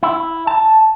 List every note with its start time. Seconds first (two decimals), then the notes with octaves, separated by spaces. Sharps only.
0.03 E4
0.47 A5